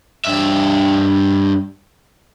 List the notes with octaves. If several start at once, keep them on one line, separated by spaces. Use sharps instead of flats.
G2 E5